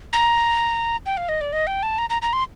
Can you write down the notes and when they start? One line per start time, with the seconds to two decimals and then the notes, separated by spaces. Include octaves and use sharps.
0.13 A#5
1.06 G5
1.17 F5
1.29 D#5
1.41 D5
1.53 D#5
1.67 G5
1.83 A5
1.98 A#5
2.10 A#5
2.22 A#5
2.33 C6